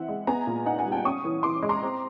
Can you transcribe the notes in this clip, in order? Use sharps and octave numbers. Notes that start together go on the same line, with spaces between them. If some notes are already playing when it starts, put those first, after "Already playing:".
Already playing: E3 C4 E5 F#5
G#3
B3 G#5 A#5
A#2
D#4 F#5 G#5
F#5 G#5
G3
G5 A5
C#4 C#6 D#6
E3
E3 C6 D6
G#3
A#5 C6
C4